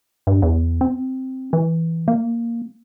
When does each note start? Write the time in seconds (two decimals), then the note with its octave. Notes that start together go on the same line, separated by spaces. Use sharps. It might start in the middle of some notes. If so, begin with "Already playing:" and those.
0.27 G2
0.42 E2
0.81 C4
1.53 E3
2.08 A#3